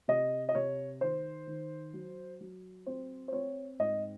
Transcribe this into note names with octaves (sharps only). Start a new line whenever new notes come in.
C3 D#5
D#5
C3 C#5
D#3 C5
D#3
F#3
F#3
C4 C5
C5
C4 C#5
G#2 D#5